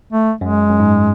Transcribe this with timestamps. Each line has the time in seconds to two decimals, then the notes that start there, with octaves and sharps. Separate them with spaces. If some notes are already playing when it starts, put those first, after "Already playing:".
0.12 A3
0.41 F#2 G#3
0.69 F#2
0.80 G#2